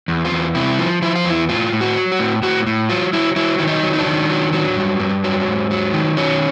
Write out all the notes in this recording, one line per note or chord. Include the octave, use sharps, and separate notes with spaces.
E2
F4
E2
C3 E4
F3
F3 E4
F4
E2 E4
A2 F4
A2
F#4
F#3
F#4
A2
A2 F#4
A2
F#3 F4
F#3 E4
F#3 E4
D#3 E4
D#4
F#3
D#4
D4
D#3
F#3
F#3
G2
G2
F#3
G#2
F#3
D#3
F#3 C#4